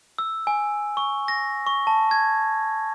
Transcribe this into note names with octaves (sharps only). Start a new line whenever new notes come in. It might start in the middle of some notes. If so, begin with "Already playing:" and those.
E6
G#5
C#6
A#6
C#6
A5
G#6